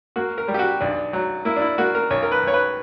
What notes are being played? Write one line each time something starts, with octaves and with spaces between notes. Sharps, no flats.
A#3 F#4
A#4
G3
G4
F#4
B1 D4
F#3
A#3 E4
D4
E4
A#3 F#4
A#4
B1 C#5
A#4
B4
B1 C#5
B4